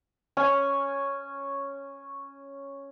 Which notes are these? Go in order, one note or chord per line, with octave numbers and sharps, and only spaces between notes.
C#4 G#5